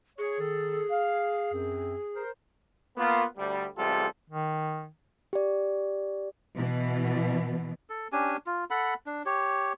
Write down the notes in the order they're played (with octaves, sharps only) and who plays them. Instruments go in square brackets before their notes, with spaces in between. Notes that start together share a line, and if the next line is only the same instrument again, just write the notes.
[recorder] G#4 [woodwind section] C#5
[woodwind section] D#3 A4
F5
F#2 C4
A#4 C5
[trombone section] A#3 B3 F4
D2 G3
A1 C3 G3 G#3 F4 A4
[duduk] D#3
[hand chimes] G4 D5
[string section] B2 E3
[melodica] A4
C#4 D4 G4 G#5
F4
A4 F#5 B5
D4
G4 C#5